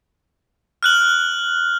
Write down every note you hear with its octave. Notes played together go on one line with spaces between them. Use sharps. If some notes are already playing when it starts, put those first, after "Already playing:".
F6 F#6 F#7